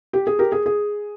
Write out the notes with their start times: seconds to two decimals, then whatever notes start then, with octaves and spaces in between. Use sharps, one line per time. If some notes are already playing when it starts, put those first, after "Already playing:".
0.13 G4
0.27 G#4
0.39 G4 A#4
0.52 G#4
0.66 G#4